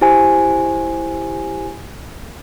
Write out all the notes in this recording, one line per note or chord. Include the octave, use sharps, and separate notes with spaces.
E4 G4 C5 G#5